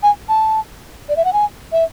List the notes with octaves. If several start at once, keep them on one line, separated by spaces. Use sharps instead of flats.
G#5
A5
D5
E5
F#5
G#5
E5